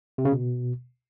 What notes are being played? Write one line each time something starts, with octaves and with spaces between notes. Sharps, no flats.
C3
C#3
B2